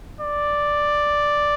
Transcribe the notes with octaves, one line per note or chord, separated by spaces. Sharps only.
D5